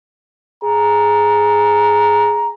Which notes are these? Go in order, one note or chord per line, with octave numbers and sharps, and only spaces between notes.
G#4 A#5